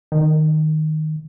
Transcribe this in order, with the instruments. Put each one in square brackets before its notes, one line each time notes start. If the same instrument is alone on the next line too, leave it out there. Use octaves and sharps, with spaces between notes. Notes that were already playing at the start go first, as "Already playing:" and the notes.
[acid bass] D#3